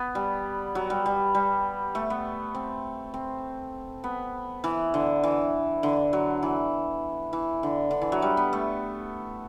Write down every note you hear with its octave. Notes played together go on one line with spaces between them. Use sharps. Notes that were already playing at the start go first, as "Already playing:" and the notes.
Already playing: B3
G3
F#3
G3
G3
G3
A3
B3
C4
C4
B3
E3
D3
E3
D3
F#3
E3
E3
D3
D3
E3
F#3
G3
B3
A3